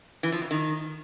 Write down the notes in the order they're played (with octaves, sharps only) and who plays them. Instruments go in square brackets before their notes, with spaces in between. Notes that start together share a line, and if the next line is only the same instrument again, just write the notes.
[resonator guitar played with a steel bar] E3
F3
F2
D#3